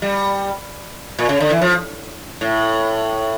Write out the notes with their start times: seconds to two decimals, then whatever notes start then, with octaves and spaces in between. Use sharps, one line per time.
0.02 G3
1.19 A#2
1.29 C#3
1.40 D3
1.50 E3
1.62 F3
2.41 A2